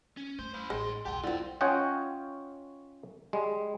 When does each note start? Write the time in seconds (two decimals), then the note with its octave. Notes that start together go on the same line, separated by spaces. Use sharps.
0.17 C#4
0.39 A3 C5
0.54 E4 C5
0.70 A1 G#2 G#3 C6
1.05 B1 E2 G4 F#5 G5 A5 C6
1.23 D3 G3 C4 E4 F4 B4 D5
1.61 C#4 F4 C#5 D#5 F#5 G5
3.33 G3 G#3